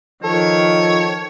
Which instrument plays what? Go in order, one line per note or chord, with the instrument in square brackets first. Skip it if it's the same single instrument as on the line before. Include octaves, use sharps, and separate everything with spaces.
[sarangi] D#3 [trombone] F3 [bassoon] A4 [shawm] C#5